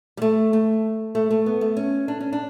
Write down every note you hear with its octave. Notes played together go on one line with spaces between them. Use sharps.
G3
A3
A3
A3
A3
B3
A3
C#4
D4
C#4
D4